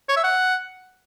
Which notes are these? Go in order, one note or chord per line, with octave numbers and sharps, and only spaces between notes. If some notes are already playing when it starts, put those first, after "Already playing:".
C#5
E5
F#5